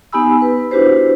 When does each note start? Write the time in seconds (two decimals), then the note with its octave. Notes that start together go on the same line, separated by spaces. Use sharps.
0.13 B3 D#4 G4 G#5 B5 E6
0.42 B4
0.71 D4 E4 F#4 G4 B4 C5